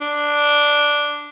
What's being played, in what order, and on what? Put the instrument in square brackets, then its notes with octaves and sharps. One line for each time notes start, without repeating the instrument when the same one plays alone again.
[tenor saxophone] D4